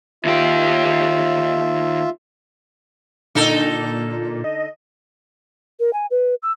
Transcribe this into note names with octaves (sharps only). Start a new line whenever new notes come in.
D#2 F4 G4 E5
A#2 D3 D#4 A4
D#5
A#4
G#5
B4
E6